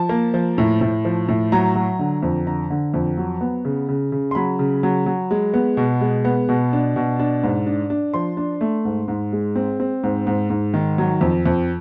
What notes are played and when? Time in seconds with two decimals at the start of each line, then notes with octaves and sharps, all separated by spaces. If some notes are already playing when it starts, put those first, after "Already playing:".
Already playing: F3 A5
0.09 A#3
0.34 F3
0.58 A2
0.81 A2
1.05 F3
1.28 A2
1.52 F#3 A#5
1.75 F#3
1.99 D3
2.23 F2
2.46 D3 A#5
2.70 D3
2.94 F2
3.17 F#3
3.41 B3
3.65 C#3
3.89 C#3
4.12 C#3
4.31 C6
4.35 F#3 B5
4.59 C#3
4.83 F#3
5.06 F#3
5.31 G#3
5.54 B3
5.77 B2
6.01 G#3
6.25 B3
6.49 B2
6.73 D4
6.96 B2
7.19 D4
7.43 G#2
7.66 D4
7.90 D4
8.14 F3 C6
8.37 D4
8.61 A3
8.85 G#2
9.08 G#2
9.32 G#3
9.56 C4
9.80 C4
10.03 G#2
10.27 G#2
10.50 G#2
10.74 D#3
10.98 F#3
11.21 F2
11.46 F2